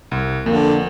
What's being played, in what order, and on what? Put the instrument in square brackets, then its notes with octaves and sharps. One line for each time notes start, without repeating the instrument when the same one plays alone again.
[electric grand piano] C2
[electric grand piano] F2 [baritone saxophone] D3 [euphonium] A#3